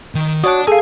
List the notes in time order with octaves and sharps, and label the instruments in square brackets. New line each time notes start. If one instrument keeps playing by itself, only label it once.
[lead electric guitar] D#3
[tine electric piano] F#4 C#5 F#5 [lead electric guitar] D5 A5 [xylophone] D#6
[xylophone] G#4 F5 [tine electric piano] A4 [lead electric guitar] G#5